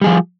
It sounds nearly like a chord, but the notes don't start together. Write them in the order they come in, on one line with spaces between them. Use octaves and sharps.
G3 G#4 F3